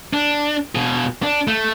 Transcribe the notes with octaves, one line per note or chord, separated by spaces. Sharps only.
D4
B2 G#4
D4
A3